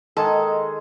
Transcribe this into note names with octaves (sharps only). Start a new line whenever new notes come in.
D#3 G#3 G#4 A4